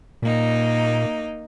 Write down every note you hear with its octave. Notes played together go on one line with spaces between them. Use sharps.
A#2 A#3 D#4